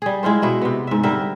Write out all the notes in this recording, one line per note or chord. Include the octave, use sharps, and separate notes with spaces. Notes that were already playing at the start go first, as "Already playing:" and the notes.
G3 G#4
G#3 E4 F4 C5
B2 E4 D#5
C3 B3
G#2 E5
D3 G3 A#4 E5